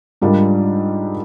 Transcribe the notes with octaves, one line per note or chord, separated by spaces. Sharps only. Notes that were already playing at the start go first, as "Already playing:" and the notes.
G#2 G3 D4 F4 A#4